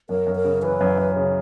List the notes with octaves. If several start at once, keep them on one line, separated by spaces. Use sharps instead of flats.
F#2 A#4
F#2
A#4
C#3
E3 B4
F#2
F#2
C#3